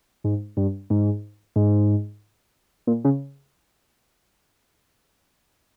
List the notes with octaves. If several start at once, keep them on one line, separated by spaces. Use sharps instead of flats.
G#2
G2
G#2
G#2
A#2
C#3